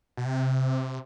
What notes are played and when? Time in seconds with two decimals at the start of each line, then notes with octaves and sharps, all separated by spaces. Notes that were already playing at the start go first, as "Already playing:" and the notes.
0.17 B2
0.25 C3